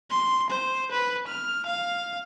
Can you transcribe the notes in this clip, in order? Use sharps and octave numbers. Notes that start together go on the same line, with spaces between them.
C6
C5
B4
F6
F5